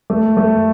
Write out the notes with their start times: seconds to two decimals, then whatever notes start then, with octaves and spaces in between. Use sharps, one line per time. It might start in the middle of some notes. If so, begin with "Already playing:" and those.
0.10 A3
0.37 A3